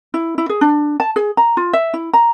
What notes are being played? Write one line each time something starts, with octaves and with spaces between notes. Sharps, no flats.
E4
E4
G#4
D4
A5
G#4
A#5
F4
E5
E4
A#5